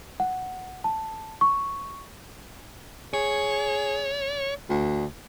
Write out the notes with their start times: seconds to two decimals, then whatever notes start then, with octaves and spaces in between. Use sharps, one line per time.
0.20 F#5
0.84 A5
1.41 C#6
3.14 G#4 C#5
4.69 D2